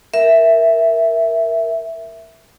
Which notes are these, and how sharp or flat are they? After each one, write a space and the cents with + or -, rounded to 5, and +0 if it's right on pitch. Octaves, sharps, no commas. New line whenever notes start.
A#4 +5 E5 +0